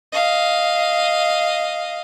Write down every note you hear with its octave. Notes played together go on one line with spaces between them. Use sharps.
D#5 F5